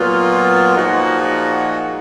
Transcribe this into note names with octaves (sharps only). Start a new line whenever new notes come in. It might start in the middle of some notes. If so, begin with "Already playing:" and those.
Already playing: A#2 F#3 B3 F4
A#2 F3 G#3 D#4 F#4